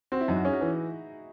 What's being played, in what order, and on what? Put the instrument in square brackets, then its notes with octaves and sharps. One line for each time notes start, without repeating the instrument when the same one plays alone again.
[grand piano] C4 [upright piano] F#4
[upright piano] E4
[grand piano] F#2 [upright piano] D#4
[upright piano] F#4
[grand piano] C#4 [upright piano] G#4
[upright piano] F#4
[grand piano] E3 [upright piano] G#4